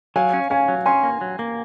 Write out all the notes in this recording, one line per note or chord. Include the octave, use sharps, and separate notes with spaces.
F#3 F5 G#5
C#4
C#4 F5 G#5
F#3
C#4 G#5 C6
A#3
F#3
A#3